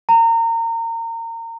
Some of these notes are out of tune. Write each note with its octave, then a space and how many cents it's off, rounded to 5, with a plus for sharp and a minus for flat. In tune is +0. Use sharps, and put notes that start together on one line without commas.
A#5 -30